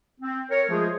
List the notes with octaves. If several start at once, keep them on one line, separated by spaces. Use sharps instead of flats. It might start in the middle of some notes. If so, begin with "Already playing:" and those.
C4
A#4 C#5
F3 G#3 A3 F4 G#4